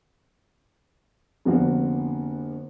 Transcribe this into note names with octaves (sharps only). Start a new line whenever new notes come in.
F1 D3 A#3 B3 F#4